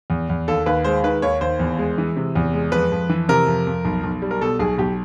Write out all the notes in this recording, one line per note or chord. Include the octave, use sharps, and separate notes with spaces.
E2
E2
D#2 A4
D#2 B4
G#3 C5
D#3 B4
D#2 C#5
D#2 C5
E2
G#3
E3
C3
E2
G#3
F2 B4
F2
E3
C3 A#4
F2
F2
B1
B1
G3
A#4
B2 A4
B1 G#4
B1 G4